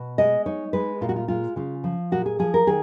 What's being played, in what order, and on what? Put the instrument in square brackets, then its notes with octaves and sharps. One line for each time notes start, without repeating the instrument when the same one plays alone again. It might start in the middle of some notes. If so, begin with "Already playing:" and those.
Already playing: [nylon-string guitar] B2
G#3 D#5
D#4 C#5
G#3 B4
A#2 F4
F#4
F4
G#3 F4
C#3 F4
F3
A#2 F#4
G#4
F3 G#4
A#4
D#3 G#4